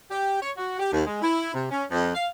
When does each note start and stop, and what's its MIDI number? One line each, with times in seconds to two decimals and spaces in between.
0.11 0.39 67
0.40 0.51 73
0.57 0.75 66
0.79 0.90 67
0.91 1.02 39
1.06 1.22 56
1.22 1.52 64
1.53 1.66 48
1.71 1.84 61
1.91 2.11 41
2.15 2.27 77